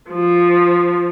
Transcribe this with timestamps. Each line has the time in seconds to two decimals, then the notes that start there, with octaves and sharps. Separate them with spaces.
0.11 F3